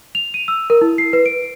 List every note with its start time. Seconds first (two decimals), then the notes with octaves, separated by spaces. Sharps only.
0.15 F7
0.34 D#7
0.48 E6
0.70 A#4
0.81 E4
0.98 C7
1.13 B4
1.26 D7